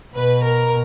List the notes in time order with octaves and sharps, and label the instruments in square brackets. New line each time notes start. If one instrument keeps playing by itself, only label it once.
[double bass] B2 [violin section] B4
[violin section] A#4